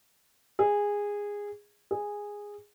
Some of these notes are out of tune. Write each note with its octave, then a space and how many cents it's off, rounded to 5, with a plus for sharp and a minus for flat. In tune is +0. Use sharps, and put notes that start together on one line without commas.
G#4 -15
G#4 -10